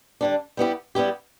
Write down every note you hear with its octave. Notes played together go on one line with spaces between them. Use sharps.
D3 G3 D4
G3 B3 E4 G4
G3 B3 E4 G4